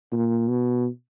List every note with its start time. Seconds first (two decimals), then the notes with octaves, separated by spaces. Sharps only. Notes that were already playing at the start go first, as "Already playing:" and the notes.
0.12 A#2
0.48 B2